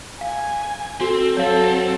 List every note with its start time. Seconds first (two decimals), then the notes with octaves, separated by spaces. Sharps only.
0.21 F5 G#5
1.01 C4 F#4 A4
1.37 F#3 A4 C#5 F5